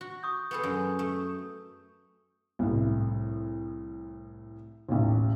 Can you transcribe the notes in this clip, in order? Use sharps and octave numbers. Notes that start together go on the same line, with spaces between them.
F#4
C#6 D#6 G6
B3 G#4 A4
F#2
A3
C2 A2
A1 D#2